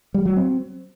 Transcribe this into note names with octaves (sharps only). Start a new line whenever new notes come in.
G3
F#3
C4